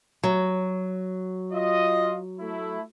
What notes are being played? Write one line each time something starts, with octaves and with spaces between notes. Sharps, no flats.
F#3
F4 D#5
A3 E4